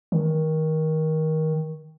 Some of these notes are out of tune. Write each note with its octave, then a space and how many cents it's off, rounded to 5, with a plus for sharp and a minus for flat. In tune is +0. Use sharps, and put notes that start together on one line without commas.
D#3 +20